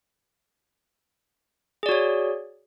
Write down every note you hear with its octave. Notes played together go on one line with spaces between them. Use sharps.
F#4 G#4 C#5 D5